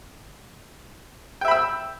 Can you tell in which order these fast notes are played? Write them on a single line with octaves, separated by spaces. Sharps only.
G5 E5 B5 E6